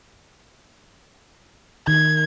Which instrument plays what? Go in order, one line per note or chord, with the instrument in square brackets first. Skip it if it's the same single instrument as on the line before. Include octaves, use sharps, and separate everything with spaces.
[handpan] D#3 [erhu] G#6